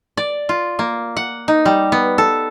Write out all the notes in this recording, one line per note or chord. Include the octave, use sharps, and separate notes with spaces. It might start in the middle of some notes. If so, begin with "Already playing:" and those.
D5
F4
A#3
F#5
D#4
G3
B3
A4